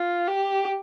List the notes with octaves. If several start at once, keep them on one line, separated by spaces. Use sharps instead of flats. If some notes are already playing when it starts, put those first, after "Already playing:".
Already playing: F4
G4